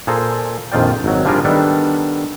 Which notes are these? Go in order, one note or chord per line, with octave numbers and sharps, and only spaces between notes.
A#2 G#4 A4 C5 A#5
A#1 F2 D#3 F4 D5 G5
G#1 F#3
F3 G3 D4 F4 G#4 A#4
D#3 G3 B3 D4 A4